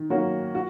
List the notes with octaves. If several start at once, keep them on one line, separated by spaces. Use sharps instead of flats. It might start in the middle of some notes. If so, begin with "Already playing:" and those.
Already playing: D#3
F#3 A#3 C#4 F#4
F#4